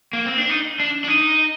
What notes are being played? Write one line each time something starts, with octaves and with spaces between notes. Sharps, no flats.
A#3
C4
D4
D#4
D4
D4
D#4